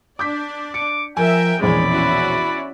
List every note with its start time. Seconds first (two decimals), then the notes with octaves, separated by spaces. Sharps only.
0.19 D4 D5 D6 G6 B6
0.74 D6 C#7
1.17 F3 A#4 E5 G5 G#5
1.62 E1 A#1 E2 G#3 C#4 D5 B5
1.92 C#4 E4 F#4